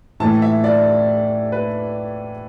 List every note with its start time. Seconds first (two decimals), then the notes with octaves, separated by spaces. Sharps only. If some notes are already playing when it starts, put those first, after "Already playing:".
0.20 A2 E3 A3 A5
0.42 E5
0.64 D5
1.52 B4